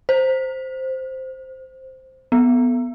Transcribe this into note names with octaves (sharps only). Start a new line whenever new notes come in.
C5
B3